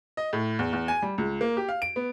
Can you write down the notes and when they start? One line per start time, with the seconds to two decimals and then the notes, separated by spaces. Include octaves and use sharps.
0.17 D#5
0.33 A2
0.59 E2
0.73 E2
0.88 G#5
1.02 G3
1.18 C#2
1.41 A#3
1.57 G4
1.69 F5
1.82 D7
1.96 B3